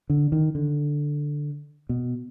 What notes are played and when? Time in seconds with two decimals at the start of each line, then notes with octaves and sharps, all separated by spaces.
0.10 D3
0.32 D#3
0.55 D3
1.89 B2